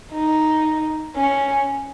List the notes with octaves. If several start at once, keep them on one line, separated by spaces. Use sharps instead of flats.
D#4
C#4